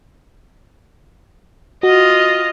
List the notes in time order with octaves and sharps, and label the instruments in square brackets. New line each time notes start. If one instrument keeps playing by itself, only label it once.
[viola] F4 D#5 [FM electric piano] F#4